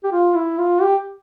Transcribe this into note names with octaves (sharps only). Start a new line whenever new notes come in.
G4
F4
E4
F4
G4